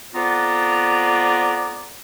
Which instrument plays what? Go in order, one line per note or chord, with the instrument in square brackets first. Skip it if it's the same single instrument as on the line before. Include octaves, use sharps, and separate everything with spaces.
[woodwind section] F2 B3 F4 D5 A#5